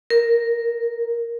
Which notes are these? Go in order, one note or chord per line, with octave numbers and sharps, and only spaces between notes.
A#4